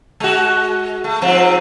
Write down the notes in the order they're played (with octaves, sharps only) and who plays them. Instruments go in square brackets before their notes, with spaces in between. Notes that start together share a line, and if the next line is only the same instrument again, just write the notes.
[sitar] G#3 F#4
A3
G#2 F3 C4